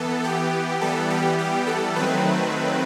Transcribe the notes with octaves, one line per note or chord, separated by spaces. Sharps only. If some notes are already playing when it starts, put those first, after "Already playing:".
Already playing: E3 B3 A4
G4
E3 G3 B3 A4
G4
G4
A4
D#3 F#3 A3 C4 B4